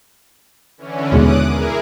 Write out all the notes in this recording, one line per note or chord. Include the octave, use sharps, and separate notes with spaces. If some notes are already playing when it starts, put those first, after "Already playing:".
D3 E3 C#4
D#2 B2 G#3 D6 D#6 F#6
E4 G#4 A#4